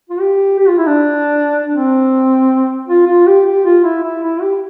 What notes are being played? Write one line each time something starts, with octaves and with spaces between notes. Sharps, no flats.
F4
G4
G4
F4
E4
D4
C4
F4
F4
G4
G4
F4
E4
E4
E4
G4